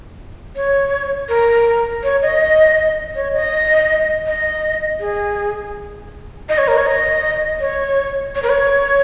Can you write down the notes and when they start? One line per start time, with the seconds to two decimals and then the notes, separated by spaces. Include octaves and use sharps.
0.56 C#5
1.29 A#4
2.03 C#5
2.22 D#5
3.15 C#5
3.33 D#5
4.26 D#5
5.00 G#4
6.49 D#5
6.58 C#5
6.68 A#4
6.77 C#5
6.86 D#5
7.60 C#5
8.35 C#5
8.43 A#4
8.50 C#5